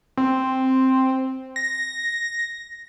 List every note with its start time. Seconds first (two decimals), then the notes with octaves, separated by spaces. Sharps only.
0.17 C4
1.56 A#6